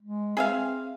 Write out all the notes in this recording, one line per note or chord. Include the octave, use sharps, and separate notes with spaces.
G#3
C4 G#4 E5 F5